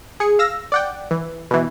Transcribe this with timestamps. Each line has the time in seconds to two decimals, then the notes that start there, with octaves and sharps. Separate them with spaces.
0.20 G#4 C#7
0.39 F5 E6 A#6
0.72 D5 F#5 G5
1.11 E3
1.51 B2 E3